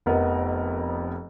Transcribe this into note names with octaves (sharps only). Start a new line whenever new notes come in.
F1 F2 B3 A#4 D#5